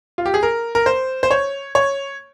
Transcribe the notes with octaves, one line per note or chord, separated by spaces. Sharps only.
F4
G4
G#4
A#4
A#4
C5
C5
C#5
C#5